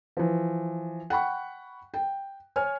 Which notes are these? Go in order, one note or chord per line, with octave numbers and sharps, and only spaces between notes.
E3 F3
F#5 G5 B5 C#6
G5
C#5 G#5 F6